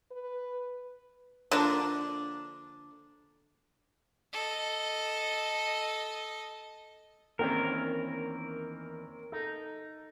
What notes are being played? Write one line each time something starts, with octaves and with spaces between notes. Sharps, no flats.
B4
D3 F3 A#3 D4
A4 D#5
E2 D#3 E3 A#3 C4 C#4 A#4
D#4 A4